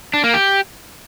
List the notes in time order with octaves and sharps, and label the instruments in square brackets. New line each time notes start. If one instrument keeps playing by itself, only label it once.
[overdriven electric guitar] D4
A#3
G4